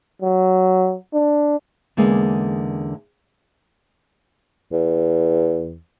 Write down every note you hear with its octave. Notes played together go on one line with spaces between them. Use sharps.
F#3
D4
E2 D3 G#3 A#3 C#4
E2